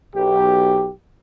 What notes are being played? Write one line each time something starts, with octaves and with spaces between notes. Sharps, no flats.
B1 G4